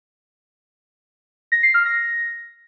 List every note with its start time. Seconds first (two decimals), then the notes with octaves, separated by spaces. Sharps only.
1.52 A#6
1.63 C7
1.74 F6
1.85 A#6